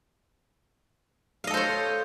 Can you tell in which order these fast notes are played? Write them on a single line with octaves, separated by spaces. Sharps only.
F5 D#5 A4 C5 C#5